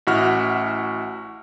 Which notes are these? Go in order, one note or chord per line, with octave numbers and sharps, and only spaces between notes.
A1 E4 F#4 F#5 F6